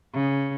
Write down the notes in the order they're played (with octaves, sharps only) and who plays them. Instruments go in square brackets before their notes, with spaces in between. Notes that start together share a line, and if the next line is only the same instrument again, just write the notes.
[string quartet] C#3